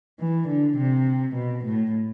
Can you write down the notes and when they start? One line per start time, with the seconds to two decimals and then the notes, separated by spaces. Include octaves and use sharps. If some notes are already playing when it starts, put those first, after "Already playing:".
0.19 E3
0.48 D3
0.77 C3
1.35 B2
1.64 A2